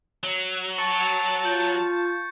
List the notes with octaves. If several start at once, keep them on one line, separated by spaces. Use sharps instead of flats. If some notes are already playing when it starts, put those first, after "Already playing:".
F#3
A5 C#6 A6 C#7
F4 G6